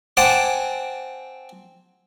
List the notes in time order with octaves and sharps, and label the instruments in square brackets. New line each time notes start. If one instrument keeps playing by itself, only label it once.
[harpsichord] C4 F#5 G#5 A5 D6